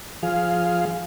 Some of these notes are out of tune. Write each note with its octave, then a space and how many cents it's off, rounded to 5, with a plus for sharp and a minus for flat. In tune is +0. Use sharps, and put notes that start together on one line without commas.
F3 +0 G#4 +10 F5 +0